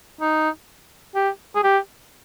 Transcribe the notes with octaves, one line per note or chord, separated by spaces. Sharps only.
D#4
G4
G#4
G4